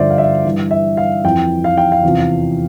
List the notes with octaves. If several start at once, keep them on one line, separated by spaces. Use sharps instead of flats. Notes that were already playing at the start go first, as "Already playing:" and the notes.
Already playing: G2 D3 F3 C5 D5 E5
F5
E5
G2 E3
E5
F5
F2 E3 G5
F5
G5
F5
E2 C3 F3